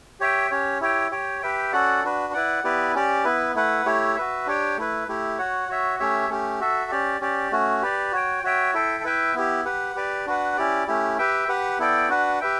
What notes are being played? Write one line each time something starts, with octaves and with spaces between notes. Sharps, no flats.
G4 C#5 E5 G5
C#4 G4 C#5
E4 G4 C#5 G5
G4 C#5 G5
G4 B4 E5 G5
C#4 F#4 A4 D5 F#5
D4 F#4 B4
E4 B4 D5 F#5
B3 E4 G4 B4 D5
C#4 G4 D5
B3 E4 B4
A3 E4 B4 F#5
A3 E4 G4 C#5
F#4 B4 E5
D4 G4 C#5 G5
A3 E4 B4
A3 E4 G4
F#4 C#5 F#5
F#4 C#5 E5
A3 C#4 G4 C#5 E5
A3 C#4 G4
F#4 A4 E5
C#4 G4 D5
C#4 G4 D5
A3 C#4 F#4
G4 B4 D5
F#4 C#5 G5
F#4 C#5 E5 G5
E4 A4 E5 G5
E4 B4 E5 G5
B3 E4 G4
G4 B4 F#5
G4 B4 D5
D4 F#4 B4 F#5
C#4 E4 G4 D5
A3 C#4 E4 G4
G4 B4 E5 G5
G4 B4 F#5
B3 E4 A4 D5 G5
D4 F#4 B4 F#5
G4 B4 E5 G5